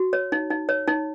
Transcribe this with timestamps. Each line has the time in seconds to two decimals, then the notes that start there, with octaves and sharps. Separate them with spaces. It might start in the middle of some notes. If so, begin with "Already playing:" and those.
Already playing: F#4
0.13 C#5
0.32 D#4
0.50 D#4
0.69 C#5
0.88 D#4